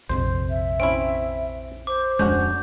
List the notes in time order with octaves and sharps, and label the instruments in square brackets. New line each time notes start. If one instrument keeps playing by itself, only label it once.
[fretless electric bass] A#1 F2 C3 [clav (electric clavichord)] C5
[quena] E5
[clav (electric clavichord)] C4 C#4 E4 [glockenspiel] D7
[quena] C5 [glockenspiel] D6
[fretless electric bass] D1 F2 G#3 [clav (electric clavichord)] C#4 D4 F#4 [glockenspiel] G6